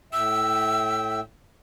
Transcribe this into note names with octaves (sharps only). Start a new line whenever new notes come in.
A2 E5 G5 E6